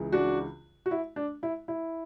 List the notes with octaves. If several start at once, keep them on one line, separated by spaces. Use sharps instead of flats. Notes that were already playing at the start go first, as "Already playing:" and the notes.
Already playing: C#2 C#3 E3
D4 F#4
F#4
E4
D4
E4
E4